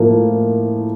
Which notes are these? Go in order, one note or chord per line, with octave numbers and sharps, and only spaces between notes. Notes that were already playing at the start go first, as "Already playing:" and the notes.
Already playing: A2 F3 A#3